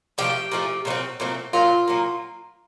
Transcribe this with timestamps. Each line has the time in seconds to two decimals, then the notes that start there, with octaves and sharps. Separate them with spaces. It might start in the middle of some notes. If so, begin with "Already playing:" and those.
0.18 A#2 F3 A3 G4
0.52 A#2 F3 A3
0.85 A#2 F#3 A3
0.90 C4
1.20 A#2 F#3 A3 C4
1.53 A#2 F#3 A#3 F4
1.88 A#2 F#3 A#3